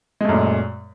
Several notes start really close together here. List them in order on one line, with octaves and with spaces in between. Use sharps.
G#3 A3 F#2 A#2